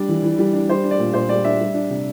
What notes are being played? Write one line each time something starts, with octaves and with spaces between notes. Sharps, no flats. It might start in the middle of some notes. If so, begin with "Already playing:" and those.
Already playing: G3 D4 D5
E3
E3
G3
D4
G3 C5
D4
D5
A#2
A#2 C5
G3 D5
D4 E5
G3
D4
C3